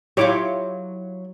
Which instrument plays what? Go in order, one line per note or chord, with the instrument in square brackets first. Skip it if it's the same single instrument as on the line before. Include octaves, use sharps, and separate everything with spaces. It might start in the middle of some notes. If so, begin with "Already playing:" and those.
[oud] F#3 E4 F4 [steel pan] G4 C#5 D6